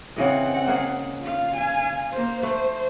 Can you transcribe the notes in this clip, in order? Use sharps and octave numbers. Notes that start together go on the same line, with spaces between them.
C#3 E3 C4 D#5 F#5
A#3 G#4
F4 F5
F5 G#5
A#3 C5
A3 C5